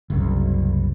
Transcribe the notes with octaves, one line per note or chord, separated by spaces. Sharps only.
F#1 C2